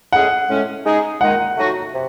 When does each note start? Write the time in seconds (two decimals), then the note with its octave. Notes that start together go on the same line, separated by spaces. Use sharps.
0.13 A2 G#3 C#4 G#4 F#5
0.49 A2 G#3 C#4
0.85 G#3 D#4 G#4
1.21 D#3 G#3 D#4 F#5
1.57 F#3 A3 D#4 F#4
1.93 C3